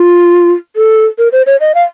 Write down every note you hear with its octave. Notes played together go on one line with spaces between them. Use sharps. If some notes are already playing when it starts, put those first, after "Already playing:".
Already playing: F4
A4
A#4
C5
C#5
D#5
F5